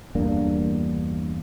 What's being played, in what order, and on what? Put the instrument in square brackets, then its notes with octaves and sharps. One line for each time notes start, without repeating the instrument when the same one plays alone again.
[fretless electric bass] E2 G2 A#3 D4